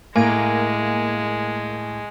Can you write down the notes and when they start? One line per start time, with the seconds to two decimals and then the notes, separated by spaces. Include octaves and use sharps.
0.16 A2 G#3 A#3 G#5 G#6 D#7